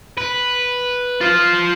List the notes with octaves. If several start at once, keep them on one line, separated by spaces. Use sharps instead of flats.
B4
F4 C5